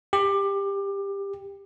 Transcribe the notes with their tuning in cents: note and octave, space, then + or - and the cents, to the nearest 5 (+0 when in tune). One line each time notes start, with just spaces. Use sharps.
G4 +20